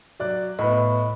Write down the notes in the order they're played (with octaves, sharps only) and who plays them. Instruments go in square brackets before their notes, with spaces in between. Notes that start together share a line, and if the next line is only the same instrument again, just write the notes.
[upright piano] F#3 D5 F#6
[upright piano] A2 B3 [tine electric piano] D#5 B5